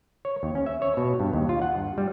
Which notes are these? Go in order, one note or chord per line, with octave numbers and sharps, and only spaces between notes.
C#5
D#2
C#4
E5
C#5
B2
G2
D#2
F4
F#5
G2
G3